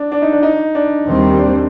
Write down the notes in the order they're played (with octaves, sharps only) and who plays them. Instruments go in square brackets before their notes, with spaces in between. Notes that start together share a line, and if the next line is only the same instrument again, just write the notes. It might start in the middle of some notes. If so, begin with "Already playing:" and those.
Already playing: [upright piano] D4
D4
D#4
D4
D#4
D4
[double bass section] D#2 D#3 G3 C4
[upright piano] D4